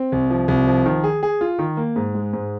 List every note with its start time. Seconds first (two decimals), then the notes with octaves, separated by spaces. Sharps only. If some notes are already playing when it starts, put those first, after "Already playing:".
Already playing: C4
0.12 C2
0.30 F3
0.48 C2
0.67 F3
0.86 D#3
1.04 G#4
1.23 G#4
1.41 F4
1.59 D#3
1.77 A#3
1.96 G#2
2.15 G#3
2.33 G#2